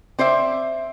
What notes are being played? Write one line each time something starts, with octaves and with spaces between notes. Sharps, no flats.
C4 C5 D5 E5